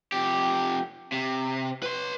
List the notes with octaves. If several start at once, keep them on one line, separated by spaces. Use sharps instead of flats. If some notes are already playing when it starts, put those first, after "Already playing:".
F2 G4
C3
B4 C6